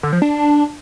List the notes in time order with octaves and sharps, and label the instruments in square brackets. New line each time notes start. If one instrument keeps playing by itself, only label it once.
[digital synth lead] D3
F3
D4